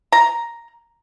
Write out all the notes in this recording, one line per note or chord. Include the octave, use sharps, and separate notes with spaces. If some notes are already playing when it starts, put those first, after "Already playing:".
A#5